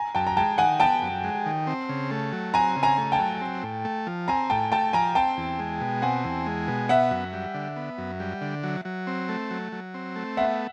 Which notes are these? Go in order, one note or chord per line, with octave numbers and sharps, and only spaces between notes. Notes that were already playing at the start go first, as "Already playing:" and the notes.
Already playing: G#5 A#5
F#2 G5 A5
A#5
G#3 G5 A5
D#3 F#5 G#5
B3 G5 A5
F#2
G#3
D#3
C4
C#3
A3
F#3
C4 G#5 A#5
C#3
G#5 A#5
A3
G5 A5
F#3
C4
A2
A3
F3
C4 G#5 A#5
A2 G5 A5
A3 G5 A5
F3 G#5 A#5
C4 G5 A5
E2
G#3
B2
C4 F#5 G#5
E2
G#3
B2
B3 E5 F#5
F#2
G3
D3
B3
F#2
G3
D3
F#3
F#3
C4
A3
F#3
F#3
C4
A3
B3 E5 F#5